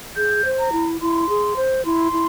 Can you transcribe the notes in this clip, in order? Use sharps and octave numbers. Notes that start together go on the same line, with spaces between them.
G#4 G6
C5
A#5
E4
E4 C6
G#4
C5
E4 C6
E4